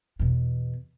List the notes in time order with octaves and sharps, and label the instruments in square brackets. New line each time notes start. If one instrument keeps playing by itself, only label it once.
[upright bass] E2 B2